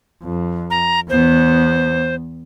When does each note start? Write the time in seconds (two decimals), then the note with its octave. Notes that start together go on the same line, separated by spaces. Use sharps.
0.23 F2
0.70 A#5
1.10 E2 B3 C5